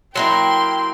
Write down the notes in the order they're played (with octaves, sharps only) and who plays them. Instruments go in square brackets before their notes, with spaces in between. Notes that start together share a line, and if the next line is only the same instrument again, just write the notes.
[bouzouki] F#3 A#3 E4 [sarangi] G5 [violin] C6